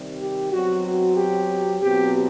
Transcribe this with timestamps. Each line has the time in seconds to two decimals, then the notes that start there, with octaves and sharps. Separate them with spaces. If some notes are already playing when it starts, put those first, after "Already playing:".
Already playing: C3 D#3 G3
0.20 G4
0.52 B2 F#3 C4 F#4
0.84 F#4
1.17 G4
1.82 E2 B2 F#3 C4 G4